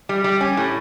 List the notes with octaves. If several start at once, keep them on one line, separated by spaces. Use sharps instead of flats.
G3
G3
C#4
A2